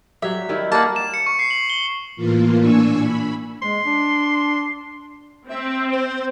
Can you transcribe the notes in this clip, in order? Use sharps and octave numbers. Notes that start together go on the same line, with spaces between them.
F#3 G3 E5
D#3 G3 E4
G3 A#3 F#5 A5
E7
C#7
C#6
C7
F#7
G7
A2 E3 A#3 F4
A#2 D4 G#5 C#6 E6
B5
G#3 C6
D4
C4 E5
C5